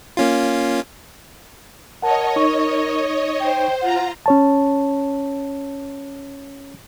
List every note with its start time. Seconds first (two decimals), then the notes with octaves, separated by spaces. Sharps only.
0.17 A#3 C#4 F4
2.02 A#4 C#5 D#5 F#5 A5
2.36 D#4 C#6
3.40 C5 G5
3.81 F4 F#5 A#5
4.26 C#4 C#5 A5